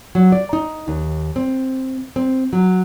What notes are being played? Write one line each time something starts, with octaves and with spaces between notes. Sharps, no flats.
F#3
D5
D#4
D#2
C4
C4
F#3